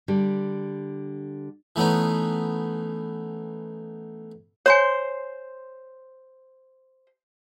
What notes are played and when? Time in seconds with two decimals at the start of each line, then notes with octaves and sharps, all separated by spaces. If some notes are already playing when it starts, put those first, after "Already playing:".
0.08 D3 G3
1.76 E3 A3 B3 C#4 D#4
4.66 C5 C#5 G#5 C6